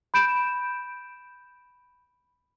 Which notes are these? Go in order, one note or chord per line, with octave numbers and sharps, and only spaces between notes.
B5 G6 D7 E7